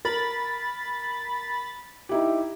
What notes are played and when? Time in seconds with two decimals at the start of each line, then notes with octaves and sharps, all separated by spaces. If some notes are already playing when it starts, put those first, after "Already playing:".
0.05 A#4 B5 A6
2.09 D#4 E4 G4